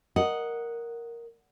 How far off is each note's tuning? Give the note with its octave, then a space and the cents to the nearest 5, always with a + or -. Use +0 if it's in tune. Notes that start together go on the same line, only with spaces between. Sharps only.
A#4 +0 D#5 +0 F#5 +0